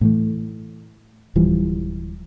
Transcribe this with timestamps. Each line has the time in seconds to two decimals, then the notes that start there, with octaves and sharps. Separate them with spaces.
0.01 A2 E3 A3
1.36 D1 E3 F3 G3